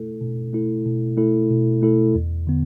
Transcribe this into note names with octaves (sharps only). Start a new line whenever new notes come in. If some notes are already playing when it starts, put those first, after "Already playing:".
Already playing: B2 A3 E4 A4
B2
A3 E4 A4
B2
A3 E4 A4
B2
A3 E4 A4
E2
D3 B3